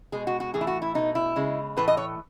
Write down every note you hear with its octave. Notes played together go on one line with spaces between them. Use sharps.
B2 G#3 G#4
F#4
F#4
A2 E3 A3 G#4
E4
F#4
E4
B2 A3 D#4
E4
C#3 G#3
A2 E3 A3 B4
D#5
C#5